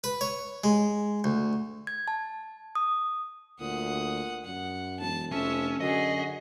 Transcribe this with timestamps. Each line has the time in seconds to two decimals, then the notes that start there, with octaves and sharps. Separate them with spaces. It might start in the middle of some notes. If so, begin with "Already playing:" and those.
0.04 B4
0.21 C#5
0.64 G#3
1.24 D2
1.87 G#6
2.08 A5
2.75 D#6
3.60 D2 A#2 F#5 D#6
4.45 F#2 F#5
5.00 E1 A5
5.32 F1 F2 C#4 E5 A5
5.81 F#2 D3 F#4 G#4 D#5